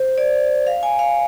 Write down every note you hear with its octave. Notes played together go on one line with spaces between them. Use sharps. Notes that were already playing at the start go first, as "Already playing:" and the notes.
Already playing: C5
D5
F5
G#5
F5